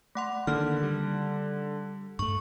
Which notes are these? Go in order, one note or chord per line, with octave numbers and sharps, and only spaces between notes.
A3 F#5 C6
D3 D#3 A#3 F6
G3
G2 A3 C#6